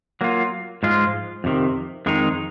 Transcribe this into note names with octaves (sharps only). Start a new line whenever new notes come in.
F#3 A#3 F4
G#2 F3 G#3 F4
F2 C3 D#3
F2 D#3 G#3 D#4